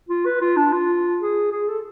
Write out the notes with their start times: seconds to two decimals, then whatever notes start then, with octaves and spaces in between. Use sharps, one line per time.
0.09 F4
0.25 B4
0.41 F4
0.57 D4
0.73 F4
1.21 G#4
1.52 G#4
1.68 A4